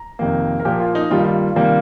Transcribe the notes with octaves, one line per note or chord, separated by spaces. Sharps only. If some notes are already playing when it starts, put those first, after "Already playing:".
Already playing: A#5
F2 C3 D#3 A#3
A#4
A#2 F3 A#3 G4
F4
D#4
G2 D#3 G3 A#3 F4
D#4
F4
C3 D#3 G3 A#3